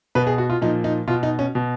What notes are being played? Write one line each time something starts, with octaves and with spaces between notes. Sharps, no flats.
B2 B4
G#4
F#4
F4
A#2 F3 D#4
D#4
B2 F4
D#4
C#4
B2